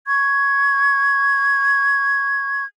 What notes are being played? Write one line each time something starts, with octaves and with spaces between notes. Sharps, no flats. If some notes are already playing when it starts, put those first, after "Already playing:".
C#6 G#6